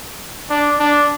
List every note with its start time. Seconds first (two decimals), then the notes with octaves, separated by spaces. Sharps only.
0.50 D4
0.80 D4